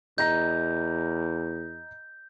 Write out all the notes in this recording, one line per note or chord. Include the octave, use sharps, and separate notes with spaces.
E2 D#5 A#5 G6 A#6